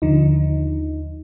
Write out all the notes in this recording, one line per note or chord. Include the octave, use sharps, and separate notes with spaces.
D#2 D3 F3 D#4